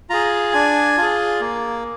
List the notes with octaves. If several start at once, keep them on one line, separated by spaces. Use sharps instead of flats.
F4 G#4 A#5
D4 G#5
F4 G#4
A#3